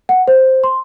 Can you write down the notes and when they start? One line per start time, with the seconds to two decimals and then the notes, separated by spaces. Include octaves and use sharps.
0.09 F#5
0.28 C5
0.64 C6